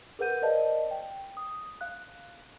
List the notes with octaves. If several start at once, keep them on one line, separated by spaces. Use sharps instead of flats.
G#4 A#4 B4 F#5 G6 D#7
A#4 C5 D5 D#5 F5 A5
G5
D#6
F5 F#6